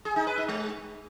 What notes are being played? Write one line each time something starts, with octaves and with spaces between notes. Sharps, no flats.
G#4
D#4
B4
D#4
G#3